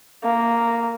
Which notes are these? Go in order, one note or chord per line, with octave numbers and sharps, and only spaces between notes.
A#3